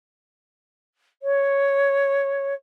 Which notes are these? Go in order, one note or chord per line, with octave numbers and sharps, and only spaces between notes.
C#5